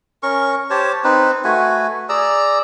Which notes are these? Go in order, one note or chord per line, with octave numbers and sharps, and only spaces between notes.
C#4 A#4 C#6
G4 C5 C#5 A5
C4 D#4 B4
A3 F#4 B4 G#5
G#4 D5 A#5 E6